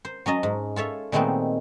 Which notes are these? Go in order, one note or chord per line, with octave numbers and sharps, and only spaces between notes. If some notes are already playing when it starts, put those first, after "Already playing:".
C5
F#3 C#4 D#5 A5
G#2
F4 A4 C#5 E5
A#2 D#3 G#3 A3 B3 C4